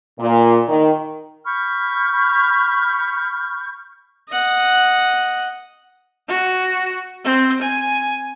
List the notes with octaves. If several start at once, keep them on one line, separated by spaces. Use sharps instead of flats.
A#2
D#3
B5 C#6 F6 G6
D#5 F#5
F#4
C4
G#5